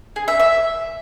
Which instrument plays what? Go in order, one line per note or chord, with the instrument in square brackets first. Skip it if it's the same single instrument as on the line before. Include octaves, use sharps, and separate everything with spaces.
[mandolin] G#4
E5
E5